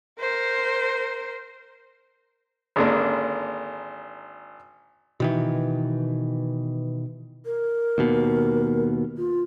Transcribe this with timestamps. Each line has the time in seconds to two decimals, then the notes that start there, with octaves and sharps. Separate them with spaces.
0.19 A#4 C5
2.76 G#1 D3 G#3 A#3 C#4 D4
5.20 B2 D#3 E3
7.46 A#4
7.98 D#2 B2
9.17 F4